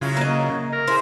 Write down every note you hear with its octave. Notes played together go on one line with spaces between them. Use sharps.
C#3 F#3 E4 F4
A#3 D#5
A#4
E4 G#4 C5